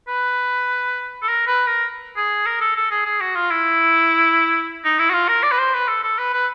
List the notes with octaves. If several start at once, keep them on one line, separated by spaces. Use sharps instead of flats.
B4
A4
A#4
B4
A#4
G#4
A#4
A4
A4
G#4
G#4
F#4
F4
E4
D#4
E4
F#4
F4
A#4
D5
B4
C5
B4
A4
A4
B4
B4